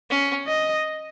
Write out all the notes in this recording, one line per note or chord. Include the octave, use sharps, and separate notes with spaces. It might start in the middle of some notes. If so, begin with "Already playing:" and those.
C#4
D#5